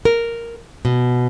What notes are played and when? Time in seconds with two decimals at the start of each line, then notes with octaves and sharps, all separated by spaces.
0.05 A#4
0.85 B2